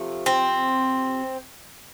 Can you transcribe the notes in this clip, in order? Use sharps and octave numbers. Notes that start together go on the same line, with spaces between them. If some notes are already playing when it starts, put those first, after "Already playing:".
Already playing: C3 F3 A3
C4